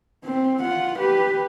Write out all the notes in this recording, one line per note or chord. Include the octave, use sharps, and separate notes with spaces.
C4
F4 F#5
G4 B4